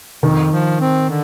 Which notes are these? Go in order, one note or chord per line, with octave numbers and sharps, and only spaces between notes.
F2 D#3
F3
C4
D3